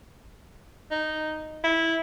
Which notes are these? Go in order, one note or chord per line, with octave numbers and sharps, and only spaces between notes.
D#4
E4